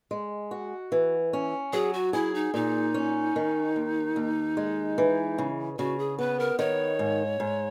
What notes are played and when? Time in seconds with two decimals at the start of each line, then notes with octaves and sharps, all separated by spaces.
0.11 G#3
0.51 F#4
0.92 E3
1.33 C#4
1.73 F#3 G#4
1.94 F#4
2.13 E4 G#4
2.35 D#4
2.54 A#2 D#4
2.94 C#4
3.36 D#3
3.76 D#2
4.16 D#2
4.57 G#3
4.98 E3
5.38 C#3
5.79 C#3 F#4
5.99 G#4
6.18 B3 B4
6.40 A#4
6.59 D#3 C#5
6.99 G#2
7.40 G#2